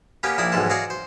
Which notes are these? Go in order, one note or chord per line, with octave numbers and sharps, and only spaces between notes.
A#3 B3 C#4 G4 B4
A#1 A#3 E4 D5 D#6
B1 G#2 E3 G#3 A5
F#4 G#4 D5 D#5 F5 C#6
C5